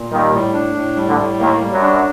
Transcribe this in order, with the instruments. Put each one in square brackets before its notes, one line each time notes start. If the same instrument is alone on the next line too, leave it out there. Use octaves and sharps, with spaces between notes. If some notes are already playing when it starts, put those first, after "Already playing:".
Already playing: [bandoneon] A#2
[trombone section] D#2 D#3 [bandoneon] G3
[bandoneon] A2
D4
A2
G3
[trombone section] D2 D3
[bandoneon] A2
[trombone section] D#2 D#3 [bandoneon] A#3
[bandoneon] G3
[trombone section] F#2 F#3
[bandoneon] D4